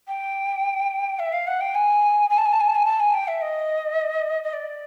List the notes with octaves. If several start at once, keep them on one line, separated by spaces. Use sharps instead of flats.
G5
E5
F5
F#5
G5
G#5
G#5
A5
G#5
A5
G#5
A5
G#5
A5
G#5
G5
E5
D#5
D#5
D5